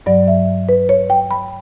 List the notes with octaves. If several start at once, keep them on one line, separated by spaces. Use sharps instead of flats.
G2 F#3 D5
E5
B4
C#5
G5
B5